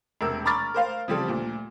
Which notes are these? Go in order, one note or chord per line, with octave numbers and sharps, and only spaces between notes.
E1 C3 A#4 E6
A#5 B5 C#6 D6 F6 A6
A#4 C5 F5
C#3 F3 G3 C4 G4 A4
D2 A#2